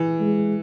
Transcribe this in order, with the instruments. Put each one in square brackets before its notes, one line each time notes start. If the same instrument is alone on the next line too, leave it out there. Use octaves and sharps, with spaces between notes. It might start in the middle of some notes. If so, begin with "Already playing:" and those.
Already playing: [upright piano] E3
[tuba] G#3